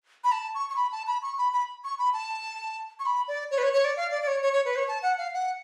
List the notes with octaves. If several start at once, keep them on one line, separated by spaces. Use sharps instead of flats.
B5
A5
C#6
C#6
B5
A5
B5
C#6
B5
B5
C#6
B5
A5
C#6
B5
D5
C#5
B4
C#5
C#5
D5
F5
D5
D5
C#5
C#5
C#5
B4
C#5
A5
F#5
F5
F#5